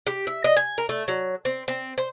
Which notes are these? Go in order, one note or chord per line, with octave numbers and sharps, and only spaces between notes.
G4
E5
D#5
G#5
A#4
A3
F#3
C4
C4
C5